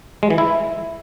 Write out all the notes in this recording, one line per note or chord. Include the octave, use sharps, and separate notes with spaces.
G#3
E3
E4